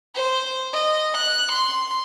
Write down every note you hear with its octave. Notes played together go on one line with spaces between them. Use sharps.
C5
D#5
F#6
C6